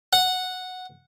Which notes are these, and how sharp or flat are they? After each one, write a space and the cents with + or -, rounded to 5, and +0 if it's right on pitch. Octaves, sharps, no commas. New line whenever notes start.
F#5 -5